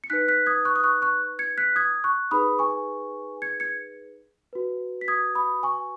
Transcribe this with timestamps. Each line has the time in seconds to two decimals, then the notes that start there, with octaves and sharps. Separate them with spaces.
0.04 C#7
0.10 D#4 B4 F#6 B6
0.28 F#6 B6
0.46 D#6 G#6
0.65 C#6 F#6
0.76 D#6
0.84 C#6 F#6
1.02 C#6 F#6
1.39 G#6 C#7
1.58 F#6 B6
1.76 D#6 G#6
2.04 C#6 F#6
2.31 D#4 G#4 B4 B5 D#6
2.59 G#5 C#6
3.42 G#6 C#7
3.60 G#6 C#7
4.53 F#4 B4
5.01 B6
5.08 D#6 G#6
5.35 B5 D#6
5.63 G#5 C#6